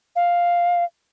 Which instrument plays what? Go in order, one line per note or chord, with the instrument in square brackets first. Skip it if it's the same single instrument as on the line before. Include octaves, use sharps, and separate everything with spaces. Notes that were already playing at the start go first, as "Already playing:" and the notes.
[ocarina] F5